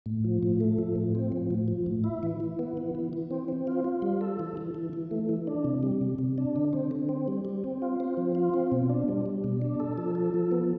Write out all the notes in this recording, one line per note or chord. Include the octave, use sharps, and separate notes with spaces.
A2
F3
A2
A3
F3
A2
C4
F3
A2
F3
A2
E4
E3
E3
B3
E3
E3
E3
C4
C4
F4
F4
G3
A4
E3
E3
E3
E3
A3
E3
D4
C3
G3
C3
C3
D4
D3
C4
D3
C4
G3
G3
C4
F4
C4
F3
F4
C4
B2
D4
G3
G3
B2
D4
A4
F3
A4
F3
B3